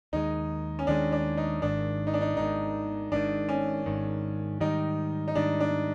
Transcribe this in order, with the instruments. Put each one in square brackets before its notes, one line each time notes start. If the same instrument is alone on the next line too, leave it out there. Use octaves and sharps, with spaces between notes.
[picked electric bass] D#2 D#3 G#3 [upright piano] D#4
[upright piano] C#4
[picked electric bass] D#2 D#3 G#3 [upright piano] D4
[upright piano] D4
D#4
[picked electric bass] G#1 G#2 D#3 [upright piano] D4
[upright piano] D#4
D4
D#4
[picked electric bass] G#1 G#2 D#3 [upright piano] D#4
[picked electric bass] G#1 G#2 D#3 [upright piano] D4
[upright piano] C#4
[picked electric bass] G#1 G#2 D#3
[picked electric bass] G#2 D#3 G3 [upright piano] D#4
[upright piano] D#4
[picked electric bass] G#2 D#3 G3 [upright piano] D4
[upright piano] D4